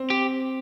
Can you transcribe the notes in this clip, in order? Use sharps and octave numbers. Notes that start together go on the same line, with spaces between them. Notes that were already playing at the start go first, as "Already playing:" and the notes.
Already playing: C4
G4